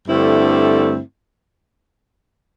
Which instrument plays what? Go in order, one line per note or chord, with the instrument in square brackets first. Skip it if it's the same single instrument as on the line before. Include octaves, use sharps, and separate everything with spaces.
[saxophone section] G2 D3 A3 C4 E4